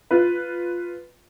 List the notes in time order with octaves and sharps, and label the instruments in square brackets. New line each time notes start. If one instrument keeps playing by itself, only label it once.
[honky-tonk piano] F4 B4